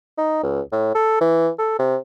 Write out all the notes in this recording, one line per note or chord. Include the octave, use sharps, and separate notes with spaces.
D#4
C#2
A2
A4
E3
A4
C3